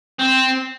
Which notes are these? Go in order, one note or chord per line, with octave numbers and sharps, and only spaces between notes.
C4